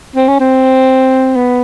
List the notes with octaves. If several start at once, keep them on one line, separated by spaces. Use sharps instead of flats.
C4
C#4
C4
B3